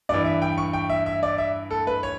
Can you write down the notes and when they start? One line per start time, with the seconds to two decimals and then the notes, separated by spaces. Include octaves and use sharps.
0.09 G2 E3 D5
0.25 E5
0.42 G5
0.58 C#6
0.73 G5
0.89 E5
1.06 E5
1.23 D5
1.38 E5
1.71 A4
1.87 B4
2.03 C#5